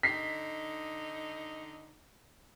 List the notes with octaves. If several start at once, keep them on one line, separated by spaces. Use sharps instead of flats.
D3 D#4 B6 C7